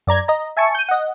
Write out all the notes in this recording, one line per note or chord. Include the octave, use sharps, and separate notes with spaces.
F#2 D5 A#5 G#6
D#5 A#5
E5 G#5 A5 C#6 C#7
G6 D#7
D#5 F#5